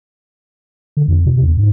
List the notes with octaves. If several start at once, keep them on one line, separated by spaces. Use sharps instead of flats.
D3
F2
C3
E2
G#2